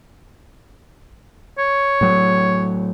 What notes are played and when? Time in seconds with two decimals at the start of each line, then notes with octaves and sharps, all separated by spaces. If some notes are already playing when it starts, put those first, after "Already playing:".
1.59 C#5
2.01 A2 F#3